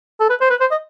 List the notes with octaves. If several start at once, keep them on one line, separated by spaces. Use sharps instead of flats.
A4
B4
C5
B4
C5
D#5